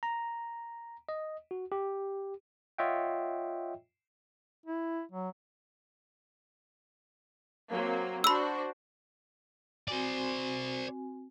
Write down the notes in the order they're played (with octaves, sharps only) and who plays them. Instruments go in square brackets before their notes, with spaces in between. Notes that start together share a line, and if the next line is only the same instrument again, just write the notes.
[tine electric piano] A#5
D#5
F#4
G4
F4 C#5 D#5 E5 F#5 G5
[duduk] E4
F#3
[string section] F#3 A#3 C4
[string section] D4 F#4 C5 [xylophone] B5 E6
[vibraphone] C4 F#4 G#5 [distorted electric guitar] C5 D5